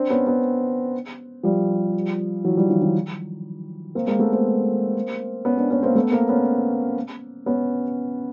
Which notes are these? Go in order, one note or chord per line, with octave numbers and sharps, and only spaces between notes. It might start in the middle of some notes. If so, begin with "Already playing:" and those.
Already playing: C4 D4
B3 C#4
B3 C#4
F3 G3
E3 F#3
F3 G3
D#3 F3
D#3 F3
A#3 C4
G#3 A#3
A3 B3
A#3 C4
B3 C#4
C4 D4
B3 C#4
A#3 C4
A3 B3
A#3 C4
B3 C#4
B3 C#4